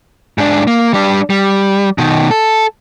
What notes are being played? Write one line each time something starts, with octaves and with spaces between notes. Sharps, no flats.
G#2 D4
A#3
G3 D4
G3
B2 D#3
A4